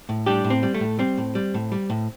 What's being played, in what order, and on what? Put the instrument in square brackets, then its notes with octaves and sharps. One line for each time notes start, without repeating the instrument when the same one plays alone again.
[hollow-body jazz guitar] A2
G3 D4 G4
A2
C4
G3
A3
A2
G3 C4
A2
G3
A2
G3
A2